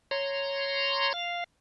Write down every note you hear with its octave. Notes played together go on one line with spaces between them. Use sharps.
C#5 A#5 C6
F5